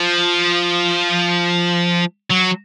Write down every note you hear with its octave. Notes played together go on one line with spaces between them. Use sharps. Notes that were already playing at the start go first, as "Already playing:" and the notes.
Already playing: F3
F#3